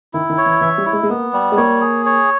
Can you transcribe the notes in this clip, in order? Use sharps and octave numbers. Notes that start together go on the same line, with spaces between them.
D#3 E4
D#3
C#5
E3
E3 E5
G3
E4
G#3
G#3
A#3 B3
G3
G#3
A#3 C#5
G#4
C#5